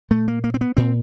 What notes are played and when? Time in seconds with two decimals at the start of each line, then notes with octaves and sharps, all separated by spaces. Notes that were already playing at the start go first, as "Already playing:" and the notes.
0.10 A#2 A3
0.28 A#3
0.44 A#3
0.54 C4
0.61 B3
0.77 A#2 C4